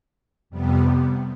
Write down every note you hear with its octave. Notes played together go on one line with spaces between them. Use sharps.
F2 C3 G3 B3